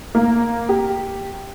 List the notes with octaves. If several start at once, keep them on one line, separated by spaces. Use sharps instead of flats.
A#3
G4